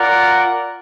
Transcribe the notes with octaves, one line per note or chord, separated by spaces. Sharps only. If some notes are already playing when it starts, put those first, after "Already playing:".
Already playing: F4 A#4 D5 F#5